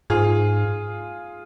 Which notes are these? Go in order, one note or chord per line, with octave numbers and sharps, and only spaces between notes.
G#2 F4 G#4